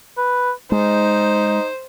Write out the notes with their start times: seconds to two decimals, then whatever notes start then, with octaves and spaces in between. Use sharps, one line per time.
0.17 B4
0.72 G#3 D#4 C5